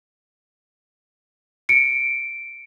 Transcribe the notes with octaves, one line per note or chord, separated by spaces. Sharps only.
C#7 D7